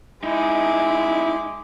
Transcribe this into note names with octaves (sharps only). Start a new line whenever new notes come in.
G#3 D#4 E4 D6